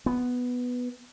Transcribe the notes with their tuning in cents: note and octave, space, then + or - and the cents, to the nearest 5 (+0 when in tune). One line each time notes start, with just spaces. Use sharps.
B3 +0